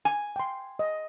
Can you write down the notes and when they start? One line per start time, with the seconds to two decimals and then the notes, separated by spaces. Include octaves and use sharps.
0.05 G#5
0.36 G5 C6
0.79 D#5